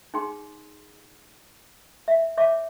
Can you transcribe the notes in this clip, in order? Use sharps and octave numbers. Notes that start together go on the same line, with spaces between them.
D#4 G#4 G5 C6
E5
C#5 E5 D6